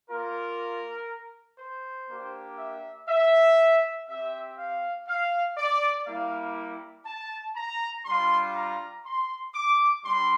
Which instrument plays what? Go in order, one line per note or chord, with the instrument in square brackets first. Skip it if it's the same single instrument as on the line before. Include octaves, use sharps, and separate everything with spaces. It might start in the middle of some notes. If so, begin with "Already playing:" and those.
[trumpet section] A#3 F4 A#4
C5
A#3 D4 G4
E5
E5
C4 G4 E5
F5
F5
D5
G3 A#3 E4 F5
A5
A#5
G3 D4 F4 C6
A#5
C6
D6
G3 D4 C6